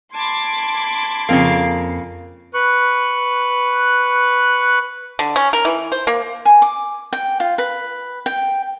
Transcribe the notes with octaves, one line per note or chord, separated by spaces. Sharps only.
A5 B5 C6 D6 G#6
F2 C#3 A#3 C7
B4 C#6 F#6
D3
C#4
A#4
E3
C5
A#3
G#5
D6
G5
F4
B4
G5